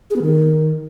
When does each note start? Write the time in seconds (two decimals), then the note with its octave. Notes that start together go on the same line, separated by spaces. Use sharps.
0.10 G#4
0.16 B3
0.22 D#3